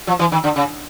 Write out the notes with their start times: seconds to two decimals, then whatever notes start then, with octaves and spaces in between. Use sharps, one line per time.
0.07 F3
0.19 E3
0.32 D#3
0.44 D3
0.56 C#3